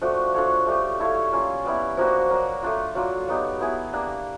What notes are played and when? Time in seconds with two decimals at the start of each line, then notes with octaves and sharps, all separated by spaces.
0.02 F3 A3 D4 F#4
0.34 D4 F4 A4 C#5
0.67 A3 D4 G4
1.00 E4 A4 C#5 F5
1.32 A#3 C#4 F4
1.65 G3 B3 E4
1.97 F3 A#3 D4 F#4
2.30 F#3 A#3 D4
2.62 A3 D4 F4
2.95 F#3 A#3 D4 F4
3.28 F#3 B3 D#4 G4
3.61 B3 E4 G#4
3.93 A#3 D4 G4